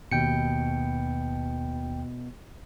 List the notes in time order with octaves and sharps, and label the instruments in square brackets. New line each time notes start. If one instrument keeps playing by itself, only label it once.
[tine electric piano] D#2 G5 C#7 [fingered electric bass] B2